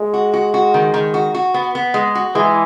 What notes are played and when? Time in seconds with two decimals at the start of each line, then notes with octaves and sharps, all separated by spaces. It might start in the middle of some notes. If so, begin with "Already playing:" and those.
Already playing: G#3
0.14 F#4
0.34 F#4
0.54 F#4
0.74 D#3
0.94 D#3
1.14 F#4
1.35 F#4
1.54 B3
1.75 B3
1.94 G#3
2.15 F#4
2.35 E3 G#3